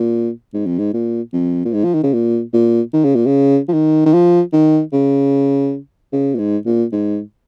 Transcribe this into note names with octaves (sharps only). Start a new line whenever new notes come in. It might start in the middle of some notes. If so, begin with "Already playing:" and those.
Already playing: A#2
G#2
F2
G#2
A#2
F2
A#2
G#2
F3
D#3
C#3
A#2
A#2
D#3
C#3
A#2
C#3
F3
D#3
D#3
F3
D#3
C#3
C#3
A#2
G#2
A#2
G#2